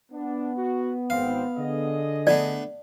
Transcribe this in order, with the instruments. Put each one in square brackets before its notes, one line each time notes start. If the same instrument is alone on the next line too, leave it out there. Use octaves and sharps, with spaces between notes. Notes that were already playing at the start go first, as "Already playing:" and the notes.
[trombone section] B3 [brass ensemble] D4
[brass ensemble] F#4
[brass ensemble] G#1 C4 [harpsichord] F5
[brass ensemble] D3 G#4 D#5
[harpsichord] A3 B3 D4 [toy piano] D5